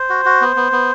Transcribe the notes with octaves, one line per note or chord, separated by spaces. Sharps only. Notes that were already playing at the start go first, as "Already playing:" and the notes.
Already playing: C5
F#4
F#4
B3
B3
B3